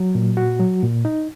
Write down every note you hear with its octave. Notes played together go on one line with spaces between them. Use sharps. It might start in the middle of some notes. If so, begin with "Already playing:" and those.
Already playing: F#3
A#2
F#4
F#3
A#2
D#4